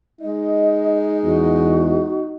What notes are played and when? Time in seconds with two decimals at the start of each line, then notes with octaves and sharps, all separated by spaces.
0.21 G#3 D#4 D#5
1.24 E2 F#4